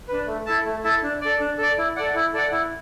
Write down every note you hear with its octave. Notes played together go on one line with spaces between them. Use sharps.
D4 B4
A3
E4 A4 E5 A5
A3
E4 A4 E5 A5
D4
A4 D5
D4
A4 D5
E4
A4 D5 F#5
E4
A4 D5 F#5
E4